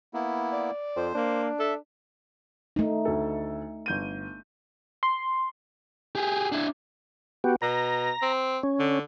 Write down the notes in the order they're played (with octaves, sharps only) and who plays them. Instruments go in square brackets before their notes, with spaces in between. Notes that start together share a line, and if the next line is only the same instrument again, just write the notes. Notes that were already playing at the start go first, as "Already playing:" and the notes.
[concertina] A#3 B3 E4
[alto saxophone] D5
[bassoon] F2 [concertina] C5
[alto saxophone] A#3 [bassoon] D4
[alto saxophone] A4 [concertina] E5
[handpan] A3 D#4
[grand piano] D2 A4
G1 G6 D#7
[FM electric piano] C6
[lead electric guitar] G4 G#4
D4 E4
[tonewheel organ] B3 F#4 G4
[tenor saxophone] B2 [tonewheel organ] A#5
[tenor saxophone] C4
[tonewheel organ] C#4
[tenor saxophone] D3